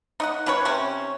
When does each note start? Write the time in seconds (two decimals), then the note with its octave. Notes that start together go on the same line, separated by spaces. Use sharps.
0.20 D#4 D#5 F#5
0.46 D#3 C#4 B4 C#5
0.65 C3 C4 C#4